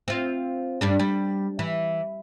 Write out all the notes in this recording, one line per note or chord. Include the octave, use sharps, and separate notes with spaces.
C4 F4
G2 G3 D4
G3
E3